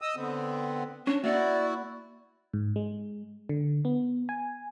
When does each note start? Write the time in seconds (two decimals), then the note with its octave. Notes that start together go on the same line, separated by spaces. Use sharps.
0.02 D#5 D#6 E6
0.16 D3 B3 C4
1.07 C#4 D4
1.24 A#3 E4 F#4 D5 F#5
2.53 G#2
2.76 G#3
3.49 D3
3.85 B3
4.29 G#5